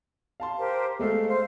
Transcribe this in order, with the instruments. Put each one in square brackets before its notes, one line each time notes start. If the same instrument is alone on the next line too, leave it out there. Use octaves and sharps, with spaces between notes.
[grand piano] F5 A5 C6
[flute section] G4 A#4 C5
[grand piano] G#3 A3 A4 [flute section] F5
[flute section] C5 F5